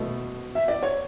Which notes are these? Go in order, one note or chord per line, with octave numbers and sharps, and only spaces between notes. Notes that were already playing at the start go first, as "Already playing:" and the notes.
Already playing: B2 A3
E5
D5
C#5